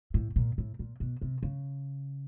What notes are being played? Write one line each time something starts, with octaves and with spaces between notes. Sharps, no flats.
A2
A#2
A2
A#2
B2
C3
C#3